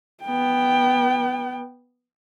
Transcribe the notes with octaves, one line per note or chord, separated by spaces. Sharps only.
B3 G5